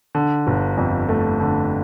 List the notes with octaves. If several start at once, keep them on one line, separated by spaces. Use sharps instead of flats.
D3
G1
F2
A3
D3